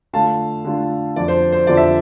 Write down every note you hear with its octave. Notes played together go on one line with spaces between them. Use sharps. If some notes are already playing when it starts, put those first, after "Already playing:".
D3 A3 D4 F4 F5 A5
D3 A3 D4 F4
F2 D3 F3 D5
C5
C5
F2 D3 F3 D5
E5